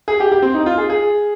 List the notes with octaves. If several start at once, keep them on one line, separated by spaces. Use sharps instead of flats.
G#4
G4
G4
C4
D#4
F4
G#4
G#4